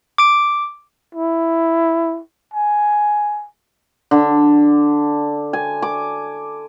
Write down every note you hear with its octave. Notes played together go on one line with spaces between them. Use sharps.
D6 D7
E4
G#5
D3
G#5
D6